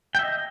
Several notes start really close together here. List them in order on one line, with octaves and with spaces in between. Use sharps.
G5 E5 D#5